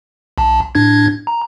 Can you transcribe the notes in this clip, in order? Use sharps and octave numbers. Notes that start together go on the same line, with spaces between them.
B1 A5
A2 D4 G#6
A#5